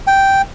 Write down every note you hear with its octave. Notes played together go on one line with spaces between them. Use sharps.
G5